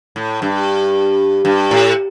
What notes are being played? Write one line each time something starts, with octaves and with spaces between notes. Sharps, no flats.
A2
G2
G2
A2